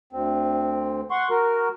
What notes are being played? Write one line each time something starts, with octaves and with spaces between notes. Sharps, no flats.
D2 C4
F#5 C6 C#6
F#4 A#4